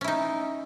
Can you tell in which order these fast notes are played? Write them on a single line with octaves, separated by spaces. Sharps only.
C#4 E4 D#4